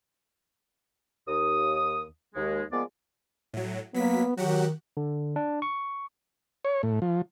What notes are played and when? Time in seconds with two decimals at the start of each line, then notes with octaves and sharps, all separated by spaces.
1.28 D#2 D#6
2.35 D#2 G#3
2.71 F3 G#3 A#3 B3 D5
3.54 A2 F#3
3.94 F#3 A#3 B3 B6
4.37 D#3 F#3 F#4 G4 F#5
4.97 D3
5.36 D4
5.62 C#6
6.65 C#5
6.83 A2
7.02 F3